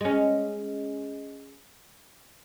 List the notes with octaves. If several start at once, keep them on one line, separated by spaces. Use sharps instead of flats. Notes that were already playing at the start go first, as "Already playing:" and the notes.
G#3 C#4